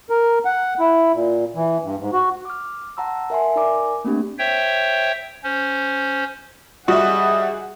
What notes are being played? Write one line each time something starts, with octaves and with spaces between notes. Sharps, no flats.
A#4
F#5
E4
A#2
E3
G2
G#2
F#4
D6 F6
F#5 A5 A#5 C6 E6
A#4 E5 G#5 C6
D#4 A#4 D5 G#5 A#5 D6
A3 A#3 C4 D4 G4
C5 C#5 E5 G5
C#4 C5
G3 F#4 G#4 D#5 E5 F#5